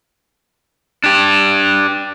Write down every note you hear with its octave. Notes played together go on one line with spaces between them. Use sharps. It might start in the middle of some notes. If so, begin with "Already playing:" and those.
D4 G4